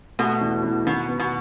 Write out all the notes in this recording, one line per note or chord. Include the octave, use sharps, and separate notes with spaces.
B2 A3
E2
E2
B2 D#3
B3
B2